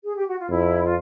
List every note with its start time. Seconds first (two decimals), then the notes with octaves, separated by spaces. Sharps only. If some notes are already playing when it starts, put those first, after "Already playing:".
0.04 G#4
0.15 G4
0.27 F#4
0.38 F4
0.50 F2 E4
0.85 F4